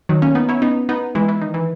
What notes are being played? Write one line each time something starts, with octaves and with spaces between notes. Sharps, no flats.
D#3 F#3
A#3 C#4
B3 D#4
C#4 E4
B3 D#4
B3 D#4
E3 G#3
E3
D#3
E3